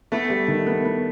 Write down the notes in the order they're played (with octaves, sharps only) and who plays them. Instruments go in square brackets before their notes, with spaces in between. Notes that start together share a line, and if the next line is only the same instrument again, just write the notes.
[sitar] A3 [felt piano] B3
[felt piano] G3
D#3
B3
B3